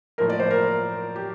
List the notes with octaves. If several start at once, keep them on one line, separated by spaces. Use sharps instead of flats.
A2 F3 A#3 A#4
D5
C5
A#4
G4